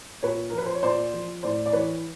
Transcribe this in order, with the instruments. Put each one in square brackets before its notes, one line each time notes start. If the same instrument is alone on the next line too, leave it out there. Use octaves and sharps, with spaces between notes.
[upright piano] A#2 B4 C#5
F3 A#4
B4
C5
C#5
A#2 C5 D5
F3
A2 C5 D5
D5
E3 B4 C#5